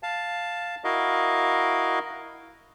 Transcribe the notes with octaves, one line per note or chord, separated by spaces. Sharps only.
F5 A5
E4 F#4 A#4 D#5 F5